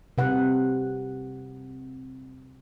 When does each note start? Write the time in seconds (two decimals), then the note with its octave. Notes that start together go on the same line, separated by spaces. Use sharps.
0.18 C3 B4 F#5